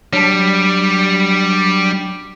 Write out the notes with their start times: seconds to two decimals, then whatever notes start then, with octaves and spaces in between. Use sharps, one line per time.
0.13 F#3 G3 D4